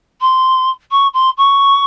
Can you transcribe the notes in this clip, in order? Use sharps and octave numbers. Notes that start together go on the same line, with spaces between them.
C6
C#6
C6
C#6